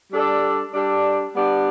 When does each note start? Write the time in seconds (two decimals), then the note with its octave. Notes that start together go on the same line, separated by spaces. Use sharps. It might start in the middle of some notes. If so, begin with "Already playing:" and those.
0.12 G3 D4 A4 D5
0.73 G3 D4 A4 D5
1.35 G3 B3 D4 G4 D5